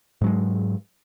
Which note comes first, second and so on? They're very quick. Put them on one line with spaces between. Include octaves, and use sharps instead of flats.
G#2 F#3 G#3